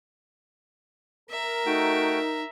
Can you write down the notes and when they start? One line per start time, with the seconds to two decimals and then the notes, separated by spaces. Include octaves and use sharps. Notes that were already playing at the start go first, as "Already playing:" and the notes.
1.30 A#4 E5 A#5
1.66 A3 D#4 F#4 G5